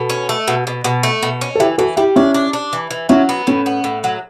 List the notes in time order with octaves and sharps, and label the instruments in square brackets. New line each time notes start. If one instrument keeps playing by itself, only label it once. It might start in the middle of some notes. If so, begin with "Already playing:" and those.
Already playing: [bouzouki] B2 [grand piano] A4
[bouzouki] C#4
A3
B2
B2
B2
A3
B2
C#4
[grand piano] A4
[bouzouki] E3 [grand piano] E4 G4
[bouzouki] E3 [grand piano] F#4 A4
[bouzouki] G3 [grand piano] E4 G4
[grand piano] C#4 E4 [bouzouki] D4
[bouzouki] D4
D4
E3
E3
[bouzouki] F#3 [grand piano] C#4 E4
[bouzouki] B3
[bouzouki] A2 [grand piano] C#4
[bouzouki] B3
A2
F#3